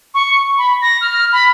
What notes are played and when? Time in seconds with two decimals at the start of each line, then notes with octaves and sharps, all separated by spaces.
0.14 C#6
0.58 B5
0.82 A#6
1.01 F6
1.32 B5